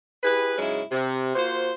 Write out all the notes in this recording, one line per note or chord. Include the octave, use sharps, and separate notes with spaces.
E4 G4 G#4 B4
G#2 C#3 F#3 G#3 C#4 E4
C3
A#3 F4 F#4 C5